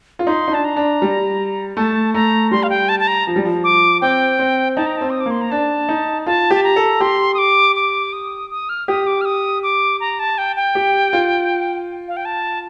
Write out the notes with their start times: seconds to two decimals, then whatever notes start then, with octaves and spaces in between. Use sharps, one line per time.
0.19 F4
0.27 D#4 C6
0.48 D#4
0.52 D4 A5
0.64 A#5
0.76 D4
1.02 G3
1.77 A3 A5
2.14 A3 A#5
2.51 G3 C6
2.63 F5
2.70 G5
2.89 A5
3.00 A5
3.08 A#5
3.27 F3
3.36 G3
3.45 F3
3.64 D6
4.01 C4 G5
4.39 C4
4.76 D#4 A5
4.86 A#5
4.97 C4 A5
5.10 D#6
5.21 D6
5.26 A#3
5.31 C6
5.41 A#5
5.51 D4 A5
5.89 D#4
6.26 F4 A5
6.51 G4 A5
6.64 A#5
6.76 A4
7.00 G4 C6
7.34 D#6
7.38 D6
7.76 D6
8.13 D#6
8.51 D#6
8.69 F6
8.88 G4 D#6
9.07 D6
9.21 F6
9.25 D#6
9.63 D6
10.00 A#5
10.19 A5
10.38 G5
10.56 G5
10.75 G4
11.13 F4
12.08 F5
12.17 G5
12.25 A5